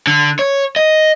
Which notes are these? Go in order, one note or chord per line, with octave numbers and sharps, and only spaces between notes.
D3
C#5
D#5